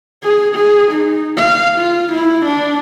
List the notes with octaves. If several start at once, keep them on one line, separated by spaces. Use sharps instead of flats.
G#4
G#4
D#4
F5
F4
E4
D4